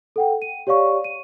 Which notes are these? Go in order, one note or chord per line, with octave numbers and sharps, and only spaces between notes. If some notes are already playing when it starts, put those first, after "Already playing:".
A4 F#5 G5
D#7
G4 C#5 D5 F5 C#6
D#7